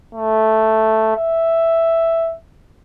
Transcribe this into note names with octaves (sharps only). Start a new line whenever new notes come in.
A3
E5